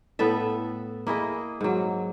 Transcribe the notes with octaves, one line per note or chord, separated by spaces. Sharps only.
A2 B3 A4 E5
A#3 E4 G#4 D#5
G#2 F#3